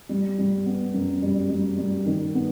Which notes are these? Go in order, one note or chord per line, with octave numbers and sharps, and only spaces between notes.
G3
G3
B3
F#2
G3
G3
G3
D#3
B3